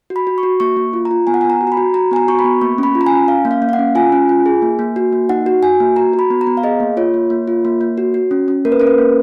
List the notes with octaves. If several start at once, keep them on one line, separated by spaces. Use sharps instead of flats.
F#4
B5
F#4
C#6
F#4
A#3 C#6
A#3
F4
A#5
F4
B3 G#5
F#5
B3 G#5
A#5
F#4
A#5
B5
F#4
F#4 A#5
B3 G#5
A#5
F#4 C#6
B5
B3
A#3 C#6
C#4 B5
F4
A#5
C#4 G#5
C#4 F5
A#3
F5
A#3
F5
F#5
C#4
F4 G#5
C#4
F4
G#4
A#3
A#3
F#4
A#3
D#4 F#5
F#4
F#4 G#5
A#3
F#4 A#5
F#4
B5
B3
A#5
B3
F5
G#4 D#5
A#3
F4 C#5
A#3
A#3
F4
A#3
A#3
F#4
F#4
C#4
C#4
A#3 A#4
B4
C#4 A#4
B4
A#3